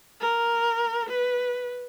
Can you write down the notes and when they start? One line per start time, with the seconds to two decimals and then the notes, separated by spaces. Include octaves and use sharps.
0.20 A#4
1.09 B4